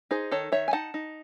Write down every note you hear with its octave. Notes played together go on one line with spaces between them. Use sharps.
D#4 G#4 C5
D#3 A4 C#5
D#3 C#5 E5
G#5
D#4 F#5 A5
D#4